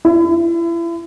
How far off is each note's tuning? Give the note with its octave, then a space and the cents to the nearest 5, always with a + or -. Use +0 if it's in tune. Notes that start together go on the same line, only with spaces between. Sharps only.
E4 +35